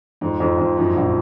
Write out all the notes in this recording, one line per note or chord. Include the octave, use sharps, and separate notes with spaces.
F2 G#2
F2
F2
F#2 F3
A#1